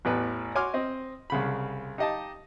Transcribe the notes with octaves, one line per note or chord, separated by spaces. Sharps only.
A1 E2 A2 B4
F#4 C#5 G#5 C6 D6 F6
C4 D#5
C2 C#3 B5
D#4 G4 D#5 F5 A5